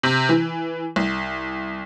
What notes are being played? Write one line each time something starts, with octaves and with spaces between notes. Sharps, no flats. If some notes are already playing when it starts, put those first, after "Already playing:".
C3
E3
C2